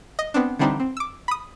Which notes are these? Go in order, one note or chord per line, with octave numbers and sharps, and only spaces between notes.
D#5
B3 C4 D4
D3 E3 G3 C4 D4 D#4
C4
D6 E6
B5 D#6